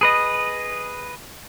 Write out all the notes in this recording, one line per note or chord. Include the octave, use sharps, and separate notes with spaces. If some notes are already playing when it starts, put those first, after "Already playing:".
G#4 B4 D#5